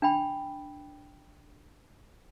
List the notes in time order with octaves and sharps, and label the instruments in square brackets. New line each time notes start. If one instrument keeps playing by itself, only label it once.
[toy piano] D4 G5 B5